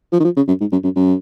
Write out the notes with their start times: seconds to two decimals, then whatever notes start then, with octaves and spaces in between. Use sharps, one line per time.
0.12 F3
0.20 D#3
0.24 F3
0.37 C#3
0.48 F#2
0.61 G#2
0.72 F#2
0.84 F#2
0.96 F#2